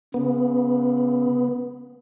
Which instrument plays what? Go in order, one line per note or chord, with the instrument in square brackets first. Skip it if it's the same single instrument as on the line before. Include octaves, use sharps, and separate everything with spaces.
[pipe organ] C#3 [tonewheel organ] B3